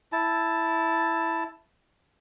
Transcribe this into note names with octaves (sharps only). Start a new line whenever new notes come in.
E4 A5